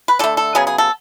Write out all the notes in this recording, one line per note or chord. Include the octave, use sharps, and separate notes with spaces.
B4
D3 A3 A4
A4
C#3 F#3 B3 G#4
G#4
A4